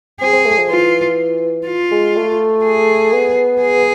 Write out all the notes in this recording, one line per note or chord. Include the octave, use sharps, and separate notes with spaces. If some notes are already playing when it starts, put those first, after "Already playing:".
C4 G#4
C4
A3
F3
E3 F4
F4
G#3
A3
G#4
B3
G#4